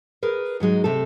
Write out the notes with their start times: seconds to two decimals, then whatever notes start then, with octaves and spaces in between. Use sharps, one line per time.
0.23 G#4 A#4 B4
0.60 G#2 F#3 G#3 D#4
0.84 C3 A3 A4